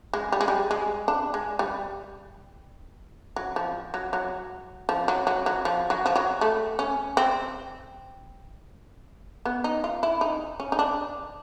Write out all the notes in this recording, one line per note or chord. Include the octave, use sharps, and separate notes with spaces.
G#3
G3
G#3
G3
G#3
D4
G#3
G3
F#3
F3
F#3
F#3
F3
F#3
F#3
F#3
F3
F#3
F3
F#3
A3
C#4
C4
B3
D#4
F4
E4
D#4
C#4
D#4
D4